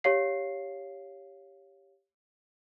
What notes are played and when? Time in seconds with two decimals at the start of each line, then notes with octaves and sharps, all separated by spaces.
0.04 G4 C#5 F5 C7